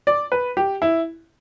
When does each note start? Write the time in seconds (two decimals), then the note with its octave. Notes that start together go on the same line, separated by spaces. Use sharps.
0.07 D5
0.32 B4
0.57 G4
0.82 E4